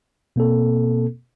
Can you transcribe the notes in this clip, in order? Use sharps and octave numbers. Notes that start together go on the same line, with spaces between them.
B2 A#3 C4 A4